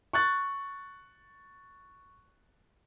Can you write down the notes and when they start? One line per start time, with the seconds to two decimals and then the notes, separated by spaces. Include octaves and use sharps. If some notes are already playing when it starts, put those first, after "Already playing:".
0.13 C#6 F#6 A6